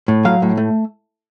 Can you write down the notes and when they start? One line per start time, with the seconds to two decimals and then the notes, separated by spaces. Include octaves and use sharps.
0.08 A2
0.25 F#3 F5
0.42 A2
0.57 A3